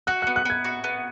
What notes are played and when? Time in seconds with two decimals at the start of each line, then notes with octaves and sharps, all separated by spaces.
0.07 F#4 F#6
0.22 F#6
0.27 B3
0.36 F#6
0.45 B3 G#6
0.64 F#4
0.84 B3